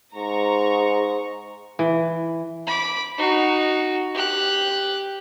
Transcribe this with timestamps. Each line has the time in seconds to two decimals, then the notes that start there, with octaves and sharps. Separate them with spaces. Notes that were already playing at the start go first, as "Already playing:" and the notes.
0.15 G#2 A#5 C#6
1.79 E3
2.67 B5 D6
3.18 D#4 F#4
4.14 G4 F#6